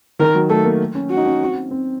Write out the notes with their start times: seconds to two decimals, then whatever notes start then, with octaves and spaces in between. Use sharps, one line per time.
0.19 D#3 A#4
0.35 F#3
0.50 A3 A4
0.65 A#3
0.95 C#4
1.10 F#4
1.17 D#4
1.25 C#4
1.41 C4
1.71 C4